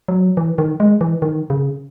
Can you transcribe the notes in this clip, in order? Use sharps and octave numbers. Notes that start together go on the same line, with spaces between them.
F#3
E3
D#3
G#3
E3
D#3
C#3